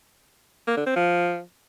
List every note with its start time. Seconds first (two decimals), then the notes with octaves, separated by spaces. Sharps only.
0.67 A#3
0.77 D3
0.86 C4
0.96 F3